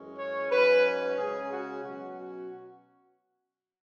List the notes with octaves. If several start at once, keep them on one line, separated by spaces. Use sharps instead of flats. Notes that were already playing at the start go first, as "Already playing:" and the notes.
Already playing: F#2 E3 G#3 C#4
C#5
G#2 F#3 C#4 B4
C#3 G#3 C#4 G#4
F#4
B2 F#3 C#4 F#4
F#4